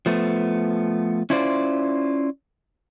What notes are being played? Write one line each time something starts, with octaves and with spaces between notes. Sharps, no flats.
F3 A3 B3
C#4 E4 F4 C5 D5